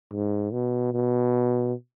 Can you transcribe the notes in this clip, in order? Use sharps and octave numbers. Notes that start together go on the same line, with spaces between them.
G#2
B2
B2